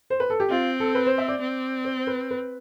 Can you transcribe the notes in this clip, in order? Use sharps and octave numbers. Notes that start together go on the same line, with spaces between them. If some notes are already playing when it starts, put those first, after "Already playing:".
C5
B4
A4
G4
C4 F4
A4
B4
C5
E5
D5
C4
C5
B4
B4